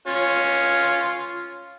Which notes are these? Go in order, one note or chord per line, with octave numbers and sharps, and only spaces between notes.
C#4 F4